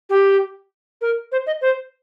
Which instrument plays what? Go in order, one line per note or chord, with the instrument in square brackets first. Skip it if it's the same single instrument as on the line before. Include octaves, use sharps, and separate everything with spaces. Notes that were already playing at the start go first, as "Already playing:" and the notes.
[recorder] G4
A#4
C5
D#5
C5